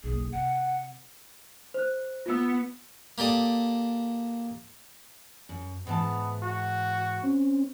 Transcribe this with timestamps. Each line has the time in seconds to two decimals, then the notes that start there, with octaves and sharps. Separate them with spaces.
0.04 F#1 B1 G#4
0.32 C3 F#5
1.74 C5 F#6
2.26 B3 F4 E6
3.18 A#3 G4 A4 D5 D#6
5.49 F#2
5.87 G#2 E3 B3 A5
6.43 F#4
7.22 C4 C#4